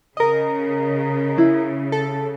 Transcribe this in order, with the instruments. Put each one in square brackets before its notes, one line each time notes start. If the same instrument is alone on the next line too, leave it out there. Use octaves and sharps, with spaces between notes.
[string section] C#3 [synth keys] A#4 D#5
[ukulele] E4
[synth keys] A4